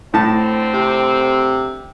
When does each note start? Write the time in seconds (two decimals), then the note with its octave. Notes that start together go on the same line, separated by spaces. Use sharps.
0.14 A2 D3 C4 A5
0.74 C3